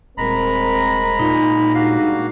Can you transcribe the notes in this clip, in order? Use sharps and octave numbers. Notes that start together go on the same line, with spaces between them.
D#1 G#3 C4 A#4 A#5 B5
A#2 D#4
G3 G#3 A#3 D4 F#4 F5